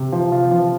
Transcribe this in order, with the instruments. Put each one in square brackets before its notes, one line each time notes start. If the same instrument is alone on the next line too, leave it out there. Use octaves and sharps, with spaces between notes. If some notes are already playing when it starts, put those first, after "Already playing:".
Already playing: [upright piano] C3
F3
F4
F3